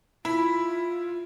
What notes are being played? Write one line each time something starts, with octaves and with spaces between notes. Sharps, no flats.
E4 F4 B5